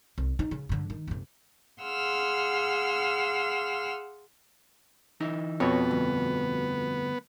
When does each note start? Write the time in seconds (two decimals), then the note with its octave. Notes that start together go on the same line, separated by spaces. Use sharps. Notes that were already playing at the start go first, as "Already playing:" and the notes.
0.18 C2
0.39 D#4
0.51 C#3
0.69 G2 D3
0.90 D#3
1.08 F#1 C3
1.82 G#4 F5 F#5 C6 E6 F6
5.20 E3 D#4 E4
5.60 F2 B2 B3 C#5
5.91 D2 G2